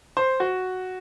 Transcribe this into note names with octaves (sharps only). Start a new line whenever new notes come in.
C5
F#4